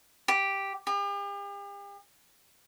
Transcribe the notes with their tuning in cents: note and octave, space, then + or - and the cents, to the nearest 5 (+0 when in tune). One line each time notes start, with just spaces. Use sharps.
G4 +0
G4 +45